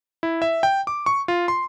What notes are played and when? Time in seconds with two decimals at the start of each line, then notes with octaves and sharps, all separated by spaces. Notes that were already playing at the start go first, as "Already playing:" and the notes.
0.23 E4
0.42 E5
0.63 G5
0.87 D6
1.06 C#6
1.28 F4
1.48 C6